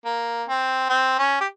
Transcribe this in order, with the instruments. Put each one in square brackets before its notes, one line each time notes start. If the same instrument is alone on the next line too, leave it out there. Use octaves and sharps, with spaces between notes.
[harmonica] A#3
C4
C4
C#4
G4